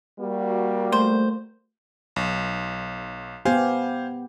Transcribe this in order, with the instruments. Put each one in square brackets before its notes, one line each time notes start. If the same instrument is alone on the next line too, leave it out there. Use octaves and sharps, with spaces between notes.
[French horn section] G3 A#3 F#4
[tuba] A3 [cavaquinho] C5
[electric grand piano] B1
[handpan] B3 G4 [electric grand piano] C5 F5 G#5